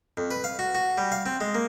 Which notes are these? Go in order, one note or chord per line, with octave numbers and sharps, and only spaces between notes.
F2
B4
F5
F#4
F#4
G3
F5
C4
G#3
A#3